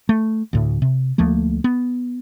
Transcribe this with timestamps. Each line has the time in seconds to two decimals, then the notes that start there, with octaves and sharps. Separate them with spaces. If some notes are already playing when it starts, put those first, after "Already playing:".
0.09 A3
0.53 D2 A2
0.82 C3
1.18 D2 F3 A3 A#3
1.64 B3